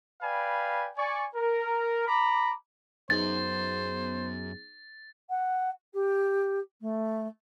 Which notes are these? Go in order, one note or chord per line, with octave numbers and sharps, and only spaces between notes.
B4 D5 F5 G5 G#5 B5
D5 G#5 C#6
A#4
A#5 B5 D6
F#2 B3 D#4 G#4 C5 A6
F#5
G4
A3